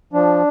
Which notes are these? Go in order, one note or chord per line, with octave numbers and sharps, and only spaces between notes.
F3 D4